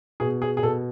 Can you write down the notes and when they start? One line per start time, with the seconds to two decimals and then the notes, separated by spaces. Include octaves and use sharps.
0.20 B2 G#4
0.42 G#4
0.57 G#4
0.63 B2 A4